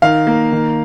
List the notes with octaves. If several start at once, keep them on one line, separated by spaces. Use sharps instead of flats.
D#3 F5
A#3
D#3